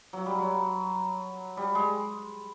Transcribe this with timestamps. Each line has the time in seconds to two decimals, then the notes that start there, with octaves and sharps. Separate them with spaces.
0.13 F#3
0.26 G3
0.39 F#3
1.57 G3
1.75 G#3